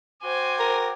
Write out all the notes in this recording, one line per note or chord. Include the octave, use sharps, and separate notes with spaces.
F#4 C5 G5 G#5 D6
A#4